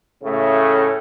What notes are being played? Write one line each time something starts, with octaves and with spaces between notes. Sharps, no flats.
A2 C#3 A3